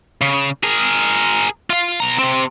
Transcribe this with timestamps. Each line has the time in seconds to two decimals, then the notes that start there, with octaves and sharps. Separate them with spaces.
0.21 C#3
0.63 G#4 A#4
1.70 F4 F5
2.00 B2 A#5
2.19 C3 C4